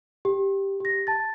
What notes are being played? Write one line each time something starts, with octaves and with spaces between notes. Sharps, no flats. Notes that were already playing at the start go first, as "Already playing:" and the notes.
G4
G4 A#6
A5 A6